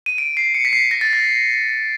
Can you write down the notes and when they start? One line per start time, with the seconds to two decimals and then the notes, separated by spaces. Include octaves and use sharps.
0.06 D#7
0.18 D7
0.37 C7
0.55 C#7
0.65 B6
0.73 C7
0.91 A#6
1.01 A6
1.13 A#6